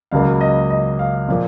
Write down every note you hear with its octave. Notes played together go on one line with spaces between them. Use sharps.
C#2 C#3 F#3 A#3 F5
D#5
D#5
F5
A#2 F3 A#3